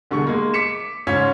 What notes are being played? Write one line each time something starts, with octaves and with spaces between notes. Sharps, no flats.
E1 D3 G3 G#4 C#6
G#3 A#3
D6 B6 C#7 E7
G#2 C#3 C#4 F4 G#6 B6